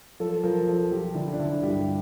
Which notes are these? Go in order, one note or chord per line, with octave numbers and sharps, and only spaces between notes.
F3 A4
F3 A#4
F3 A4
F3 G4
D3 E4
D4
D3 E4
G2 G4